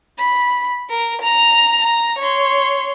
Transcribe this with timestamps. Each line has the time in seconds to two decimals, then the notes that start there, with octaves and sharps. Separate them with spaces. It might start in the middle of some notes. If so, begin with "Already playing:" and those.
0.18 B5
0.90 A#4
1.22 A#5 F7
1.81 A#5
2.19 C#5 C6